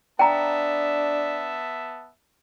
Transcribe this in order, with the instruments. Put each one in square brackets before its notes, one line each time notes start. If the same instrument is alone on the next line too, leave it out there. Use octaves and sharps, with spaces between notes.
[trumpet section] B3 E5 A5 [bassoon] D4 [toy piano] G5 A#5